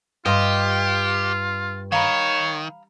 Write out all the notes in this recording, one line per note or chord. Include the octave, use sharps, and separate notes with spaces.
G2 F4 G4 D#5 F5 C6
D#3 C#5 F5 A#5 B5